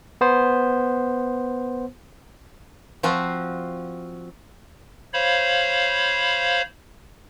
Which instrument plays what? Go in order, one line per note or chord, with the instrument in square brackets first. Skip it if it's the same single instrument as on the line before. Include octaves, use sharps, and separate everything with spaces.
[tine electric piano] B3 C5
[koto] F3 C4 F4 F#4
[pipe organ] C5 C#5 F5 B5